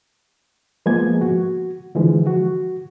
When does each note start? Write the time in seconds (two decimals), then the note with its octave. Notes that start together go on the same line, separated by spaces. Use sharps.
0.86 F3 G#3 A#3 B3 G#4 G#6
1.21 F#4
1.95 D3 E3 F3 G#3
2.27 F#4